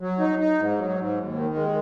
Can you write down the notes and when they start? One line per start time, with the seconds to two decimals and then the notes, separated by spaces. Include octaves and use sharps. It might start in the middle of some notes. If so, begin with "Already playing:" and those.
0.01 F#3
0.19 D#4
0.39 D#4
0.58 G#2
0.79 F#3
0.98 G#2
1.17 D#2
1.36 D#3
1.55 G#3